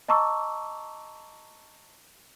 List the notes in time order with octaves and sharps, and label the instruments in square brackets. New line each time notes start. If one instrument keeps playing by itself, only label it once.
[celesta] D#5 A5 A#5 C#6 D6 E6